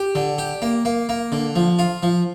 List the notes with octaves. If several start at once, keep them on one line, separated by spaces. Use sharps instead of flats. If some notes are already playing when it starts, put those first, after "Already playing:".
Already playing: G4
D3
G4
A#3
A#3
A#3
D3
F3
F4
F3